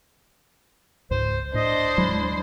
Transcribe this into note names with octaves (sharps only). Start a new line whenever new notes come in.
C#2 G#2 C5
A2 D4 C5 D#5
D#2 F#3 G#3 E4